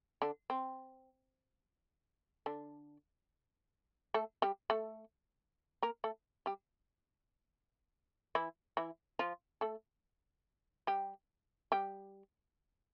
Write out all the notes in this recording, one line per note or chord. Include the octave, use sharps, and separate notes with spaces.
D3 D4
C4
D3 D4
A3 A4
G3 G4
A3 A4
A#3 A#4
A3 A4
G3 G4
E3 E4
E3 E4
F3 F4
A3 A4
G3 G4
G3 G4